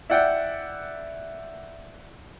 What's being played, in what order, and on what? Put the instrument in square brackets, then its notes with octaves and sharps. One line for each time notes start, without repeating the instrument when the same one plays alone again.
[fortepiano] E4 D5 F#5 G5